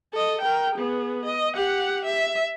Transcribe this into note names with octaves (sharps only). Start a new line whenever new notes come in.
A4 D#5
A#4 G5
B3 G#4
D#5
G4 F#5
E5